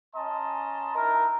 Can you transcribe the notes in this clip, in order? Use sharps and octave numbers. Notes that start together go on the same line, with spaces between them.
C#4 D#5 A5 A#5 C6
D#4 E4 A#4